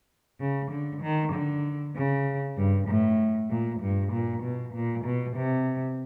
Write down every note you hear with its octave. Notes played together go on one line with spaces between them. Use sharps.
C#3
D3
D#3
D3
C#3
G2
A2
A#2
G2
A#2
B2
A#2
B2
C3